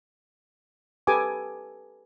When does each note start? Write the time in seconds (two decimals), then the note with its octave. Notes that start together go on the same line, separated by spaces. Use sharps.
1.07 G4 A4 B4 G#5 D6 D#6